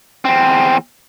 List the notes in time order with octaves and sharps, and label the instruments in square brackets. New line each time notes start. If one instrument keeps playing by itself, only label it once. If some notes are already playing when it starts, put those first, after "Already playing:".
[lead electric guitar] E2 C4